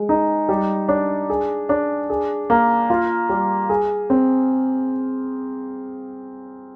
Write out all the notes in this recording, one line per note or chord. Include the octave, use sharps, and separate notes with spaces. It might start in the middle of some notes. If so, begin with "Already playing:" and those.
Already playing: G#3
D#4
G3
D4
G#4
D4
G#4
A#3
F4
G3
G#4
C4